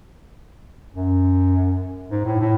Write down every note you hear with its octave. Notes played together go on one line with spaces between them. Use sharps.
F#2
G#2
A2
A2